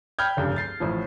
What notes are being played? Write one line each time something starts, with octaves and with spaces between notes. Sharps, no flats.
G5 B5 F6 G6 G#6
F1 C#2 G2
A6 C7
A1 A2 F3